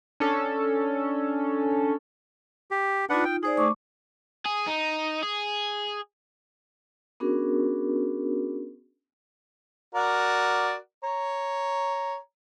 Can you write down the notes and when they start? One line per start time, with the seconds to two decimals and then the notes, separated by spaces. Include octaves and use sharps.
0.20 C#4 D4 A4
2.71 G4
3.10 D4 D#4 F4 B4 F#5
3.24 G5
3.43 D#4 G#4 C5 D5
3.57 A3 C#6 D6
4.46 G#4
4.68 D#4
5.23 G#4
7.20 B3 C#4 D4 F#4 G#4 A#4
9.95 F#4 A#4 D5
11.04 C#5 A#5